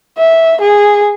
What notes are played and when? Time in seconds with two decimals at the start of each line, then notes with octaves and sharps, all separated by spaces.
0.18 E5
0.61 G#4